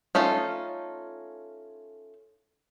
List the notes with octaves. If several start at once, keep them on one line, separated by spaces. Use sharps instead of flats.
A3 C#4 D#4 F4